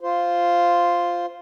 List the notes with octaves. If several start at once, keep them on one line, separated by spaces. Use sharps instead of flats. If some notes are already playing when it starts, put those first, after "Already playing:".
F4 C5